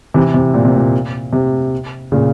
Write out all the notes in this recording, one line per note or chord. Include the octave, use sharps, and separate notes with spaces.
C3 E3
C3
A#2
C3
A#2
C3
A#2 C#3